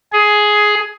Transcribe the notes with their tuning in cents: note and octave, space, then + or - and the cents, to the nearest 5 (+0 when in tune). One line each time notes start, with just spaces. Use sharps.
G#4 +10